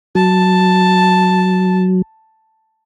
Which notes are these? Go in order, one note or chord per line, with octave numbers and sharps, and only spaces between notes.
F#3 A5